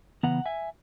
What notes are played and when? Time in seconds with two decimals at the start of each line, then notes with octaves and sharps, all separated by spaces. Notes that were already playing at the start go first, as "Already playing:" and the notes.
0.23 C#3 E3 B3 F#5 A#5
0.46 E5 G#5